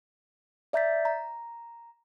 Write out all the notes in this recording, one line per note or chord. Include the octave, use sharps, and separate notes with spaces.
D5 E5 A#5 G6 A6 B6
A#5